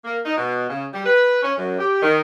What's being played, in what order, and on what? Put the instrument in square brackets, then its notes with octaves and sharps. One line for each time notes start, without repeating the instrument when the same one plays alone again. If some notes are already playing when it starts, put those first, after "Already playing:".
[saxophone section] A#3
D#4
B2
C#3
G3
B4
C#4
F#2
G4
D#3